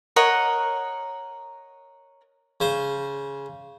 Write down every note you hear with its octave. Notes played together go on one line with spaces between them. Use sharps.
A#4 C#5 D#5 F#5
C#3 C5